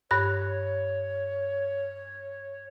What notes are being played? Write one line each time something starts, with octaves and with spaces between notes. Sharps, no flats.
G2 C#5 F#6